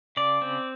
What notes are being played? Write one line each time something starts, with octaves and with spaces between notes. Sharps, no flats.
C#3 D5
C4